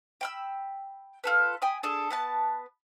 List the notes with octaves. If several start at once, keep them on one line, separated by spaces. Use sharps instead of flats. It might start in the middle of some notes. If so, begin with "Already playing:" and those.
G5 B5 E6
F4 A4 B4
G5 G#5 B5 D#6
D4 G#4 A4
B3 B4 A5